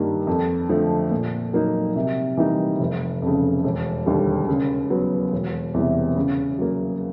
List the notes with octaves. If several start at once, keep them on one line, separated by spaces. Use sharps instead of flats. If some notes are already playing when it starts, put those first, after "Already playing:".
Already playing: G2 D#3 G3 A#3
F2
D3 F3 A3
A#2
F#3 A#3 D#4
C3
E3 G3 A#3 D#4
F1
F2 C#3
E1
D#2 D3 G3
C#3
F#3 B3
E1
E2 C3 E3
C#3
F#3 A#3